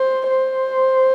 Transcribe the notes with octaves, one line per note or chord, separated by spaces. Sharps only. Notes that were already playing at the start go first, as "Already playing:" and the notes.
Already playing: C5
C5